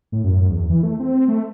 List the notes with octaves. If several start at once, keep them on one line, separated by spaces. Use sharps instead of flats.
A2
F#2
E2
E3
A3
C4
A3